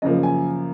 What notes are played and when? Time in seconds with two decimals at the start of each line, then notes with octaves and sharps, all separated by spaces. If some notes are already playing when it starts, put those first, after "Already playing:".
0.02 F#2 C#3 F3 A#3 D#5
0.23 G#5